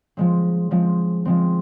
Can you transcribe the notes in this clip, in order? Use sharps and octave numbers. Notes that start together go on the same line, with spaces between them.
F3 G#3 C4
F3 G#3 C4
F3 G#3 C4